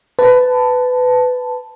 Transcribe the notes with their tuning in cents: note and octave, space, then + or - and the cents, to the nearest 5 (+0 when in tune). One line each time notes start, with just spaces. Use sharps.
B4 +20 A5 +0